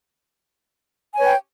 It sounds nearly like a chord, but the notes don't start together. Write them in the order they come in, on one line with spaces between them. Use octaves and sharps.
G#5 C#5 B4 G5